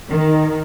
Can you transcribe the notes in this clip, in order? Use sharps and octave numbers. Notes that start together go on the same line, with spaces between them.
D#3